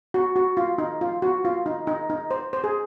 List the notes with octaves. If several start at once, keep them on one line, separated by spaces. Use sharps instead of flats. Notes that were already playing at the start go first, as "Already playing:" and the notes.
F#4
F#4
F4
D#4
F4
F#4
F4
D#4
D#4
D#4
C5
C5
G#4